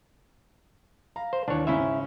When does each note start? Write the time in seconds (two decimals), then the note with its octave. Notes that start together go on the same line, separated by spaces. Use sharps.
1.16 F5 A#5
1.33 C5
1.48 D#2 E3 D4 C#5
1.67 G#2 C#3 C#4 E4 E5